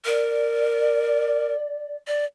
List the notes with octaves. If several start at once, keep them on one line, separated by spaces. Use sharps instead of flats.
A#4 D5
D5